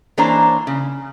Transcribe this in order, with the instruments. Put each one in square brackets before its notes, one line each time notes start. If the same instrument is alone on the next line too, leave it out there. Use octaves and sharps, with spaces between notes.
[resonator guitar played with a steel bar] E3 A#3 D4 C5 C#5 A#5
C#3